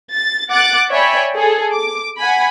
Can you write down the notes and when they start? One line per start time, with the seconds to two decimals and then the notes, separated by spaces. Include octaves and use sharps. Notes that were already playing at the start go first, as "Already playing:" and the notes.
0.12 A6
0.51 F#5 D6 F#6 A6
0.90 C#5 D5 E5 G5 G#5 B5
1.35 G#4 A4
1.72 D6
2.18 F#5 G#5 B5